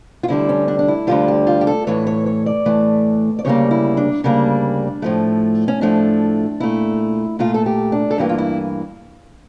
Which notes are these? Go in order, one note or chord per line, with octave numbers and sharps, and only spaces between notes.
F4
D2 D3 G3 E4
C#4
D4
D4
E4
D2 D3 G3 F4
G4
F4
G4
A4
A2 E3 A3 C#5
C#5
C#5
D5
A2 E3 A3
D5
D2 C#3 G3 A#3 C#5
E4
D4
D2 C#3 G3 A#3 D4
A2 F3 A3
C#4
A2 F3 A3 D4
A#2 A3 E4
A#2 A3 F4
A4
G4
D4
A4
G2 E3 A#3 G4
F4
E4